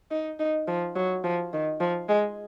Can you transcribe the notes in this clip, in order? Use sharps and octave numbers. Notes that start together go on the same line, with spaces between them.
D#4
D#4
F3
F#3
F3
D#3
F3
G#3